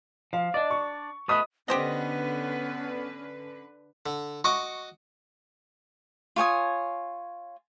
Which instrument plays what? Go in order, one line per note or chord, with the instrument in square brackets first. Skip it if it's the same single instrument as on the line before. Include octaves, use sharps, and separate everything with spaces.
[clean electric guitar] F3 [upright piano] F5
[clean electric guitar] D4 D5 [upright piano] D#5
[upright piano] C#6
[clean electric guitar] A3 B3 B4 [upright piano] D#5 D#6
[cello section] D3 B4 [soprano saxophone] B3 [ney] C#4 [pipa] G4 C5 D#5
[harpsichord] D3
[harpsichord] F#4 D#5 D6 [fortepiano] C#6
[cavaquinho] F4 C#5 G#5 D#6